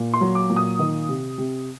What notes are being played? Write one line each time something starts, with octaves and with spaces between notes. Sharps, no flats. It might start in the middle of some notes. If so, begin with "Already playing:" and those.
Already playing: A#2
C6
F#3
D6
A#2
D#6
D#3
C3
C3